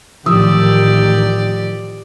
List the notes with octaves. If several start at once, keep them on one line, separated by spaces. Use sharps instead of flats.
A1 D#3 F3 G4 D5 D#6 E6